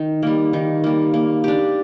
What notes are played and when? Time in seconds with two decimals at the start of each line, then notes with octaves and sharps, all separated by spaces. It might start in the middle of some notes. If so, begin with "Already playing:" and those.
Already playing: D#3
0.23 G3 A#3
0.53 D#3
0.84 G3 A#3
1.14 A#3
1.44 D4 G4